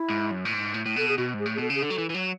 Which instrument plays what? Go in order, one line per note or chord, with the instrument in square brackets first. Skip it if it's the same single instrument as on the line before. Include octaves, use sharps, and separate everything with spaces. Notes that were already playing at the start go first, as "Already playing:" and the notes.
Already playing: [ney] E4
[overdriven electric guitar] G#2
F#2
A2
G#2
A2
A2
[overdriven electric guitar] B2 [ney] A4
[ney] G#4
[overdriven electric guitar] B2 [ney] F#4
[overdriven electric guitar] G#2
[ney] G#4
[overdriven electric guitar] A2
[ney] G#4
[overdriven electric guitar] B2 [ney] A4
[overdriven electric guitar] C#3
[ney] G#4
[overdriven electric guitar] D3 [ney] A4
[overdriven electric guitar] F#3
E3
E3
F#3